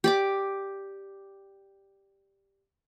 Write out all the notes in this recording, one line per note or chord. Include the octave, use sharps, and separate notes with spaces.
G4 D5 D6